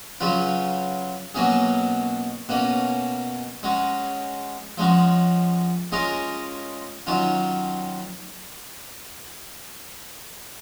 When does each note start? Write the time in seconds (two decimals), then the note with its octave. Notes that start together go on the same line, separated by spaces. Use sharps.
0.20 C#3 F#3 C#4 F4 B4
1.35 B2 F#3 A#3 C#4 G#4
2.49 B2 A#3 C#4
3.63 G#3 C#4 F#4
4.78 F3 G#3 C#4 F#4
5.92 G#3 C#4 F4 A#4 D#5
7.07 D#3 F#3 C#4 F4